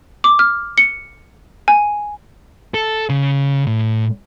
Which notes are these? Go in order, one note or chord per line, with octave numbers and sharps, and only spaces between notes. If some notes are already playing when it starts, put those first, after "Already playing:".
D6
F6
C#7
G#5
A4
C#3
A2